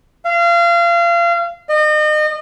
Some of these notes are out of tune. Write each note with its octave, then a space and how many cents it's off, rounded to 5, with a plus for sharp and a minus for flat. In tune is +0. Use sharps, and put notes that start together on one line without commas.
F5 -30
D#5 -35